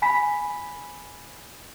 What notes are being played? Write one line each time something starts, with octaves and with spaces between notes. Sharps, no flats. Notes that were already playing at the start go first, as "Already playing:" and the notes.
G#5 B5 B6